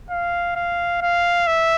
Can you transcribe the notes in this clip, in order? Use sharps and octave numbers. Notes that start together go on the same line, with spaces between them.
F5
F5
F5
E5